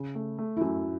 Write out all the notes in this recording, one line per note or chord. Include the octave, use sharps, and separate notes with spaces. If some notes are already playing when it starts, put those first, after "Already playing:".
Already playing: C#3
A3
A3
E4
F#2 F#4